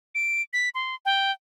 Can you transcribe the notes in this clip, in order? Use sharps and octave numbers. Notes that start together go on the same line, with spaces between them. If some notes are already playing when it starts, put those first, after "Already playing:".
D7
B6
C6
G5